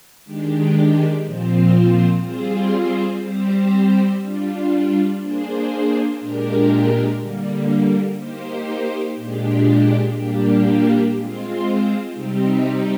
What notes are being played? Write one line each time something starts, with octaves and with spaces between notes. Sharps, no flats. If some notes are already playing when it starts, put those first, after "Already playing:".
D#3 G#3 D4 G4
A#2 F3 C4 F4 C5
G3 C4 F4 G#4 C5
G3 C4 G4 C5
G3 D4 F4
A#3 D4 G#4 C5
A#2 G#3 D4 G4 A#4
D3 G3 A#3
A#3 D#4 G4 C5
A#2 G#3 D4 G4
A#2 G3 A#3 D4 G4
G#3 C4 F4 C5
C3 G3 C4 D#4 G4